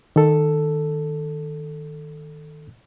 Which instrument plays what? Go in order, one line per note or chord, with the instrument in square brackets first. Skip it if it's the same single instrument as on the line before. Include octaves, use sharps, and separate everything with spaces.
[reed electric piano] D#3 A4